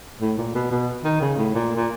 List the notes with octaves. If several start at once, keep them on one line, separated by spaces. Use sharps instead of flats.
A2
A#2
B2
B2
D#3
C#3
A2
A#2
A#2